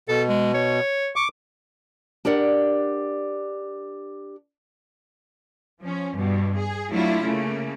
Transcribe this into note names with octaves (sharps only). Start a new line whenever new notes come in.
B2 A4
G#3
C#5
C#6 D6
D4 G4 A#4 D5 F#5
F3 C#4
G2 B2
G#4
F#3 A3 D4 E4 F4
C#3 A3 A#3